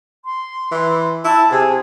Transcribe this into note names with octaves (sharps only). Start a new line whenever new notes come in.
C6
E3
E4 A5
C3 G#4